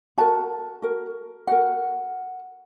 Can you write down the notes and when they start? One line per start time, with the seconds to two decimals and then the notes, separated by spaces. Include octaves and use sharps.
0.18 F#4 A#4 A5
0.82 F#4 A#4
1.47 F#4 A#4 F#5